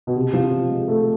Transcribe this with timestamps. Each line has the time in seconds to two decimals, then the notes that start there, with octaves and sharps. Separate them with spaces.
0.07 B2
0.16 C3
0.33 F3
0.70 G#3
0.88 A3